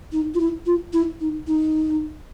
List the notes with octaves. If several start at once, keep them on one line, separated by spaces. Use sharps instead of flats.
D#4
F4
E4
F4
E4
D#4
D#4